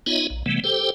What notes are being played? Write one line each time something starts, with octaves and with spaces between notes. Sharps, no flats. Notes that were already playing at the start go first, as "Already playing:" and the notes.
B3 D#4 F4 C#5 D#5 E5
A#1
C3 E3 G3 A3 B3
G4 A4 C5 G5